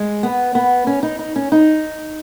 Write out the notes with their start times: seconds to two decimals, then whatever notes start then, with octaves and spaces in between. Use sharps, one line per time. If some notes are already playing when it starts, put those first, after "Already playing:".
Already playing: G#3
0.23 B3
0.55 B3
0.87 C#4
1.03 D#4
1.19 D#4
1.36 C#4
1.52 D#4